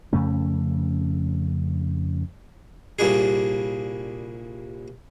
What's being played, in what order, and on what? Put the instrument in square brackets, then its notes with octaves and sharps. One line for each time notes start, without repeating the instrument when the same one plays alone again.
[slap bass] F2 C#3 A3 C#4
[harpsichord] C2 A#2 G3 D4 G#4